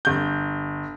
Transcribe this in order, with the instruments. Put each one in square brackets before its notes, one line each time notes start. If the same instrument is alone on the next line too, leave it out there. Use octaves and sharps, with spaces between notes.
[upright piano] G1 G6